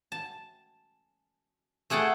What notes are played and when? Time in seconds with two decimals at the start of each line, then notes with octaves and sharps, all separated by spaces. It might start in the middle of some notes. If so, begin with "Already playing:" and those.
0.12 A5
1.90 A3 G#4 F#5 G5 A5